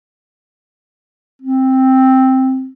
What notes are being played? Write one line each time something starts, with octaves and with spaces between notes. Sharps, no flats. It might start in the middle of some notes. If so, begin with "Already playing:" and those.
C4